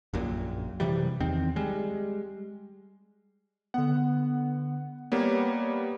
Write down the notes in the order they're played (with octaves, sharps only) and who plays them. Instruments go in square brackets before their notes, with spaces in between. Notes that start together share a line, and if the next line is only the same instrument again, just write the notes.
[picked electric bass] A#1 F#2 A#2
F#2 C3 E3 G3
E2 D#3 C4
G3 G#3
[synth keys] D3 B3 [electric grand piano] F#5
[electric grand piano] G3 A#3 B3 [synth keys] C#5